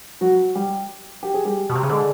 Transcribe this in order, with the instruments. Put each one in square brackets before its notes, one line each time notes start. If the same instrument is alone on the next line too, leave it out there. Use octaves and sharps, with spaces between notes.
[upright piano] F#3 F#4
G3 G4
G4
G#4
G3 G4
[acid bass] B2
C3
C#3
[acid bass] D3 [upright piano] G#3 G#4